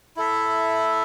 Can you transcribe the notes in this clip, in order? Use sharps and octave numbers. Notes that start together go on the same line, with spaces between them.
E4 A4 E5